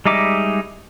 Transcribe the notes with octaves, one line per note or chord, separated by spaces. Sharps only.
G3 G#3 D#4 E5 D6